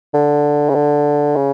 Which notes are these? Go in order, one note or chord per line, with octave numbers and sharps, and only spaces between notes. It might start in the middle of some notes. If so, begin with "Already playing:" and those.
D3
C#3
D3
C#3